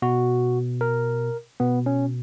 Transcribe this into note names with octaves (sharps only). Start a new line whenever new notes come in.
B2 F#4
A#4
B2 B3
C#4